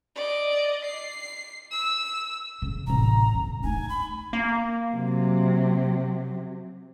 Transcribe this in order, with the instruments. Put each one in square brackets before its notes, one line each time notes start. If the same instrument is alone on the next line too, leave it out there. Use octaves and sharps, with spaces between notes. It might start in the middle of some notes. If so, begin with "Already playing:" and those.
[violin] D5 D#5
C7
E6
[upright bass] C#3
[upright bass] A1 C3 [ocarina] A#5
[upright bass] G2 C#3
[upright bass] A3 D#4 [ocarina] G#5
[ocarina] B5
[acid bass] A#3
[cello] C3 F#3